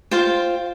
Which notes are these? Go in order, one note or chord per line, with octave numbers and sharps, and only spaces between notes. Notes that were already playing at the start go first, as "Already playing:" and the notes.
F4 C5 G5